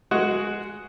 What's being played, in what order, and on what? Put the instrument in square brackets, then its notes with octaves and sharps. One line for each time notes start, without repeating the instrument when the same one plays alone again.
[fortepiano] G#3 F#4 G#4